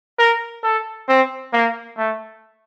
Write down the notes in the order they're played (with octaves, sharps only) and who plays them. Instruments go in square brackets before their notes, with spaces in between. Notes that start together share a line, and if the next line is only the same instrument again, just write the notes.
[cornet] A#4
A4
C4
A#3
A3